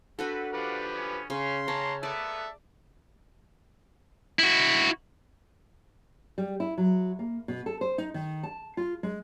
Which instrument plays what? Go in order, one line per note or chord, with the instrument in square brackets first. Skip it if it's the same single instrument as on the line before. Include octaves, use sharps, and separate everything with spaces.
[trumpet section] C4 B4 [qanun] D4 F#4 A4
[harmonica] F3 G4 B4 [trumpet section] D5 F5 F#5
[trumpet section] B3 C#4 C#5
[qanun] C#3 [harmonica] C#4 [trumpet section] C6
[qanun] C#4 [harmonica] C#5 A5 A#5
[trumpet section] A#3 B3 B4 [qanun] D5 [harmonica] E5 A5
[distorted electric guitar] E4 F#4
[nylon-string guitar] G3
E4
F#3
A#3
B2
A4
C5
D#4
D#3
A5
F4
G#3